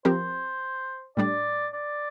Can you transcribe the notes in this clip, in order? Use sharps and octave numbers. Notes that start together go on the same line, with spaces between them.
F3 C4 G4 A#4 C5
A2 G3 D4 D5
D5